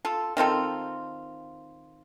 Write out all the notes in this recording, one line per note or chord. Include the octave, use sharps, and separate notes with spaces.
F4 A4
D#3 C4 F4 A4